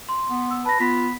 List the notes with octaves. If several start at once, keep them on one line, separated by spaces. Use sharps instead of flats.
C6
B3
E6
B4 A5 A#6
B3 F4 B6